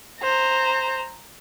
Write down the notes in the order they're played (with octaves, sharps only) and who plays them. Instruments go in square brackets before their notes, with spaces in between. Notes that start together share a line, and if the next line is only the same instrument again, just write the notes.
[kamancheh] C5 A#5